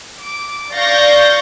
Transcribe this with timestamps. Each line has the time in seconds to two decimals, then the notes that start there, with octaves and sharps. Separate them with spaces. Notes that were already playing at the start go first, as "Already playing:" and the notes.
0.21 D6
0.71 D5 F5 C#6 G6 A6 A#6